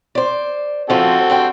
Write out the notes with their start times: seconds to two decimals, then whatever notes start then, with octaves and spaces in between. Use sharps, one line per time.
0.15 C5 D5
0.90 F2 C#3 F3 C4 F#4 A4
1.30 G2 C5 G5